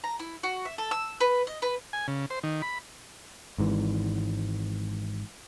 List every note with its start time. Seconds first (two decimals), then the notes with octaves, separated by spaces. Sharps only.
0.04 A#5
0.19 E4
0.43 F#4
0.65 E5
0.78 A4
0.91 E6
1.21 B4
1.47 D#5
1.62 B4
1.93 G#5
2.08 C#3
2.30 C5
2.43 D#3
2.62 B5
3.58 G#1 G#2 E3